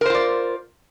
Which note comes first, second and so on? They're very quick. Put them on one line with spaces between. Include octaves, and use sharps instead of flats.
A#4 C5 F4 D5